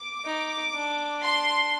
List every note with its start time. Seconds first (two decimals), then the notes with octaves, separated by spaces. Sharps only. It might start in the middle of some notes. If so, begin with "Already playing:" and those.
Already playing: D6
0.25 D#4
0.75 D4
1.23 C6